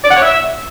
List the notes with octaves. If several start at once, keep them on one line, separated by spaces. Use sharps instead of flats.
D5
F#5
C#5
E5